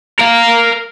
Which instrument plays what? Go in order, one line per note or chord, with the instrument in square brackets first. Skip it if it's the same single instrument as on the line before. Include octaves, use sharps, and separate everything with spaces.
[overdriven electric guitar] A#4 F5